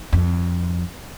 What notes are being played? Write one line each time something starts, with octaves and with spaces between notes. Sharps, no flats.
F2